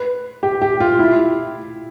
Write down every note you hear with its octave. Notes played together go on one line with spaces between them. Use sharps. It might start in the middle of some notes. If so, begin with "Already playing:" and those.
Already playing: B4
G4
G4
F4
E4